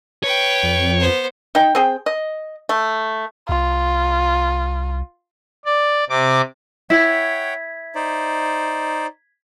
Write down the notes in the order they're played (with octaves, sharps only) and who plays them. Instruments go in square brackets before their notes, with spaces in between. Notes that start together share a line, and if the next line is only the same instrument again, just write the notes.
[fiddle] B4 G5 [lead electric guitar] C#5
[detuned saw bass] F2
[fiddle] B3 C5
[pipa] D#4 G5
C4 G#4 G5
D#5
A3
[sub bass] C2 [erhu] F4
[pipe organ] D5
C3 D6
[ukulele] E4 [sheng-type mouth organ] C#5 F#5 G5 [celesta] G#6 B6
[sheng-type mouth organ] D#4 C5 D5